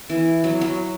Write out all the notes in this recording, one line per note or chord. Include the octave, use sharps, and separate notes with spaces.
E3
F#3
F#3